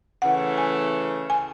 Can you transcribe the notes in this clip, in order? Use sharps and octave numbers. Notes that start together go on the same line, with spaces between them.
C#3 E3 A3 F#5
G#5
G#5